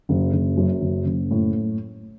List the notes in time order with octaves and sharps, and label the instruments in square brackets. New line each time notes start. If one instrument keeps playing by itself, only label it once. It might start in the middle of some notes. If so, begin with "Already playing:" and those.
[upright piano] F#1
F#1
F#2
F#1
F#1
A2